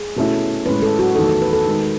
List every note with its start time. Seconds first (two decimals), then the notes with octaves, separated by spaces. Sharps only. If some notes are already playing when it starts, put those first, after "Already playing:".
Already playing: G#4
0.16 B2 A3 C#4 E4
0.66 A2 G#3 C#4 B4
0.83 A4
0.99 F#4
1.16 E2 D#3 A3 D#4 A4
1.29 A4
1.42 B4
1.53 A4
1.66 D#3 G#3 D#4